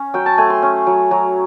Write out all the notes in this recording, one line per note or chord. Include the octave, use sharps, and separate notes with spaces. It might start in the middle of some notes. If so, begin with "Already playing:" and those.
Already playing: C#4
F#3 G5
A5
A3 G#5
C6
C#4
F#3
F#3